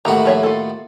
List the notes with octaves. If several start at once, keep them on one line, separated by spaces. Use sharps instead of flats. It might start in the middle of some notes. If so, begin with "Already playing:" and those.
D#2 A2 F#4 A#5
F3 C#5 E5
F4 A4